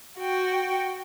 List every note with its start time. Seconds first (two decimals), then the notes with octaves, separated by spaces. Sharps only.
0.18 F#4 G5